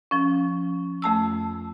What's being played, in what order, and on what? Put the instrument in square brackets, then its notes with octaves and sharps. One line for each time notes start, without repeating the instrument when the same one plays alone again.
[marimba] F3 C#4
F2 A3 A5 E6